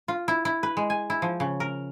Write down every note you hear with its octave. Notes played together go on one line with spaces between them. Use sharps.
F4
E4
E4
B4
G#3
G#5
E4
F3
C#3
A#4